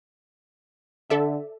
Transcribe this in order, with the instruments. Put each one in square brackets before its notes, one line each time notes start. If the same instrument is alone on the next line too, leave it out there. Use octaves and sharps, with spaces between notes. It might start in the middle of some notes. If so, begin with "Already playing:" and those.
[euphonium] D3 [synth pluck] A4 D5 E5